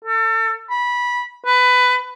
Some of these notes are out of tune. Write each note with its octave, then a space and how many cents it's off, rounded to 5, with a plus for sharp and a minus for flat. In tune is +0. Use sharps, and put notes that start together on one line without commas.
A4 +35
B5 -20
B4 +15